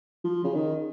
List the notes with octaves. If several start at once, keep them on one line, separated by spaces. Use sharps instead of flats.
F3
C#3
D#3